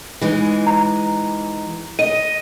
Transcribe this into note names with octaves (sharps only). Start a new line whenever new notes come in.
E3 G#3 D#4
A#5
D#5 D#7